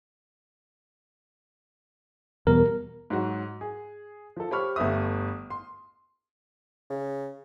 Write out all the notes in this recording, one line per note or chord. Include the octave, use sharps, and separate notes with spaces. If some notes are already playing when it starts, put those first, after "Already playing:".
E2 B2 G3 A#4
G#2 F#3 F#4
G#4
F3 A4
G4 C5 C#5 B5 C#6 F6
G1 A3 G4 B4 E5 D#6
C6
C#3